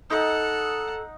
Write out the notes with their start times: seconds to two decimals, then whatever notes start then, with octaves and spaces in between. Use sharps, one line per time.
0.10 D#4 A4 F#5